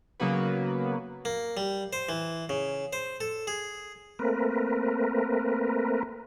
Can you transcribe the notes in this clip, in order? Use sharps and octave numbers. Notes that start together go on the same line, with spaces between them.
C#3 F#3 A#3 B3 F#4 B4
A#3
G3
C5
E3
C#3
C5
A4
G#4
A3 A#3 C4 A#4 B4